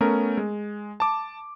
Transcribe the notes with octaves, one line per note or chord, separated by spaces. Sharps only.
A3 B3 C#4 A#4
G#3
A5 D6